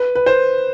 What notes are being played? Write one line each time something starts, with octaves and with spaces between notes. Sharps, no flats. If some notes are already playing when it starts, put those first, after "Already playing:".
Already playing: B4
B4
C5